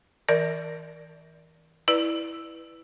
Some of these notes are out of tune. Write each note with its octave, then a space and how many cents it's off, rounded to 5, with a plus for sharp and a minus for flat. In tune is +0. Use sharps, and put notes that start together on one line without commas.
E3 -40 A#4 +0 D5 +0
E4 +0 B4 +0 D5 +15